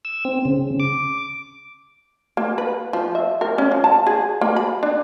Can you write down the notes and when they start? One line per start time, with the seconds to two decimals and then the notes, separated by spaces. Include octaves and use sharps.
0.05 E6
0.25 C4
0.45 C#3
0.80 D6
2.37 A#3
2.58 B4
2.93 F3
3.15 E5
3.41 A#4
3.58 C#4
3.72 F3
3.84 A5
4.07 G#4
4.41 A#3
4.56 B5
4.83 D4